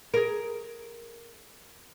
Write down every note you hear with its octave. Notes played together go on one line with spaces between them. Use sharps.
G#4 A#4